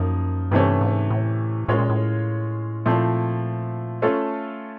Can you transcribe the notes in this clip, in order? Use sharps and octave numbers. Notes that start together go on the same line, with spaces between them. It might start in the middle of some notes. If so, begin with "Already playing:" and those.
Already playing: F#2 F3 A#3 D#4
G2 C3 E3 A3 C#4
G#2
A2
A2 G#3 C#4 F4 A#4 C#5
A#2
A2
A#2 F3 A3 C4 E4
A3 C#4 F4 A4